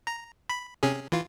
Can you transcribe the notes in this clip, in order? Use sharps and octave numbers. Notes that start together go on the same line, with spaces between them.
A#5
B5
C3 C#4 G#4
E3 F4